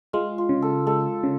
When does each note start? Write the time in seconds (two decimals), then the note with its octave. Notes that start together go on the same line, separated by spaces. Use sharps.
0.13 G#3 F4
0.38 F4
0.49 C#3
0.62 A4
0.87 G#3 A4
1.23 C#3